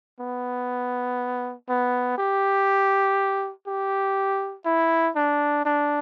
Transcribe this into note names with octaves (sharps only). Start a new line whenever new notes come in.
B3
B3
G4
G4
E4
D4
D4